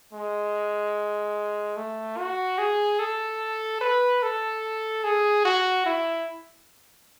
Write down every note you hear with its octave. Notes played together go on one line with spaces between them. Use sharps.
G#3
A3
F#4
G#4
A4
B4
A4
G#4
F#4
E4